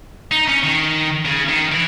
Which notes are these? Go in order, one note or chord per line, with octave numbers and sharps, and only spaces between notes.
D#4
C#4
D#3
C#3
D#3
E3